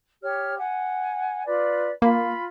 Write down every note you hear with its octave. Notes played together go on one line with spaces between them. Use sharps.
G4 C#5 F6
F#5 G#5
F4 B4 D5
A#3 F4 B5